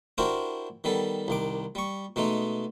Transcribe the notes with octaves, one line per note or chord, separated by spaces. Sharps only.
D4 E4 F#4 G4 A#4 C5
D#3 G3 B3 A4
C2 D#3 D6
G3 C#6
B2 G#3 A3 D#4